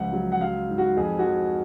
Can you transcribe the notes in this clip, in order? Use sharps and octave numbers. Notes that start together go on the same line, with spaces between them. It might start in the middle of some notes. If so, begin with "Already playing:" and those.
Already playing: C#2 F3 F#5
F#3
F#5
F#3 F5
G#2
F#4
F2 G#4
F#4
F3 G#4